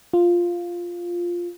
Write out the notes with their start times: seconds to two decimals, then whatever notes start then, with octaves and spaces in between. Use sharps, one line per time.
0.13 F4